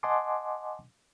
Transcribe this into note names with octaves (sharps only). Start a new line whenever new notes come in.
D#5 F#5 G#5 A5 C6 D6